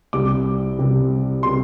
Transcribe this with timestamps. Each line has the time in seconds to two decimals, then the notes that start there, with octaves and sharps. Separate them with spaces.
0.13 C2 C3 G3 D6
0.79 C2 C3 G3
1.43 C3 G3 C6